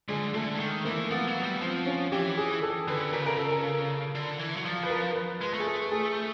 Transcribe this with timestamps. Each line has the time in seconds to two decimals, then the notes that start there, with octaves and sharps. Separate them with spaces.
0.08 D3 G#3
0.34 D3 A3
0.55 E3
0.60 D#3
0.85 E3 A#3
1.10 F3 B3
1.27 F#3
1.44 G3
1.61 F3 C4
1.86 C#4
2.12 E3 G4
2.37 G#4
2.62 A4
2.87 D3 B4
3.13 C#3 A#4
3.26 A#4
3.38 A4
3.52 A#4
4.15 D3
4.39 E3
4.56 F#3
4.65 F3
4.83 B4
4.90 A#4
5.16 B4
5.41 G#3 B4
5.54 A3
5.60 G#4
5.66 A4
5.91 G#4